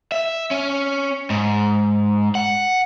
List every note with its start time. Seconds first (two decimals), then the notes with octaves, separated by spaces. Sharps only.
0.12 E5
0.51 C#4
1.30 G#2
2.35 F#5